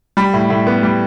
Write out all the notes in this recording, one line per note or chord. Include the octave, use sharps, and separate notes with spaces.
G3 B5
A2
A2
B3
G3